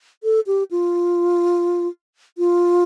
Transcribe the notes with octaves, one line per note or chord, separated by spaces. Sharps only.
A4
G4
F4
F4